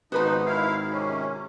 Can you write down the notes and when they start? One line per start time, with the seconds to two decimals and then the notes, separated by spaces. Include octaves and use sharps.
0.12 G#1 F3 B3 D#4 F#4 B4 C5
0.46 D#3 E4 F5
0.92 C3 C#4